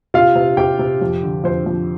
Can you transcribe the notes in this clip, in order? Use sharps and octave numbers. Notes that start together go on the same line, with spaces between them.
C3 F4 F5
C3
C3 G4 G5
C3
F2
D3
F2 C5
F2